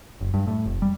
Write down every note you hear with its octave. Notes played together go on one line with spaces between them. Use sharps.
F#1
G2
A2
F1
G3